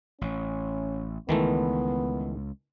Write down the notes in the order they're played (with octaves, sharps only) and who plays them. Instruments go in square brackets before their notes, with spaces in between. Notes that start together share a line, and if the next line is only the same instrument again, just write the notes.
[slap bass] A1 [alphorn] C#4
[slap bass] C#2 [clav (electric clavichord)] D#3 E3 A3 [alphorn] B3